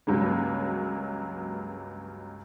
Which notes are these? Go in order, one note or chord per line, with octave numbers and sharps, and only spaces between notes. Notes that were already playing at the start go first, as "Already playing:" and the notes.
C#2 G2 F#3 G#3 A#3